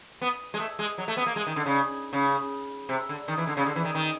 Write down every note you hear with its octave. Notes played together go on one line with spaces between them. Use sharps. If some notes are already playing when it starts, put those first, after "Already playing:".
B3
G#3
A3
G#3
F#3
A3
B3
A#3
G#3
D#3
D3
C#3
C#3
C3
D3
D#3
E3
D3
C#3
D3
E3
D#3
D#3